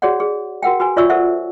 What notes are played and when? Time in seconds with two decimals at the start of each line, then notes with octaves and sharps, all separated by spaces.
0.02 F#4 G#4 C#5 D5 F#5
0.20 G#4
0.63 F#4 A#4 F#5 G5
0.80 F#4 B4 G#5
0.96 F4 C#5 D5 E5 C#6 E6
1.10 A4 C5 E5 F#5